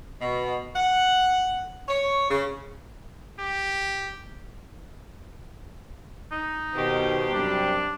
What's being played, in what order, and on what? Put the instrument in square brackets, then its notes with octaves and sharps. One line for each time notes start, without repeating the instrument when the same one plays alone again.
[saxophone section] B2
F#5
C#5
C#3
[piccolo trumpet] G4
[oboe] D#4
[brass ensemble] B2 D#3 [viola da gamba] G4 C5
[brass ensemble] F#2 C3 G3 [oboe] D4